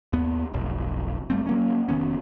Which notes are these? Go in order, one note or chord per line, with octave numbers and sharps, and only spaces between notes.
D#2 B3
F1 B1
G1 G3 A3 C4
F#3 A#3 C#4
F1 D#3 B3 C#4